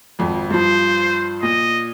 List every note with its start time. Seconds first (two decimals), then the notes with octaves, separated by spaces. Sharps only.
0.19 G#1 F2
0.50 G2 F3 C5
1.43 A#2 D#5